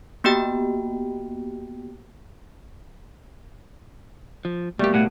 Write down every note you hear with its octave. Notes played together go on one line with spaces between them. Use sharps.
A#3 B3 F#4 G4 G5
F3
B2 G3 A3 A#3 G4
A2 F#5